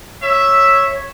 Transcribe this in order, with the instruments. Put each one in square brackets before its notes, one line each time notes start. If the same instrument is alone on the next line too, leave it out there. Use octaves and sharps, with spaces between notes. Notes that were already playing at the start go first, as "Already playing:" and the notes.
[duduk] C#5 [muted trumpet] E5